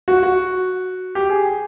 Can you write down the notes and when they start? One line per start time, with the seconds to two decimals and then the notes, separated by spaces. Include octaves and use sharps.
0.08 F#4
0.23 F#4
1.15 G4
1.30 G#4